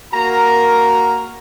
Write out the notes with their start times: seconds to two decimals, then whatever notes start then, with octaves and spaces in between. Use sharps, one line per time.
0.13 A#3 F#4 A#4 A#5